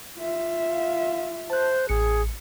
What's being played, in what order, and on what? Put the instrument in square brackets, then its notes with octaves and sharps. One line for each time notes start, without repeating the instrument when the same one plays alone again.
[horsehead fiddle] F4 E5
[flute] F5
[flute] C5 [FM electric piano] A5 F#6
[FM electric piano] A1 C#7 [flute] G#4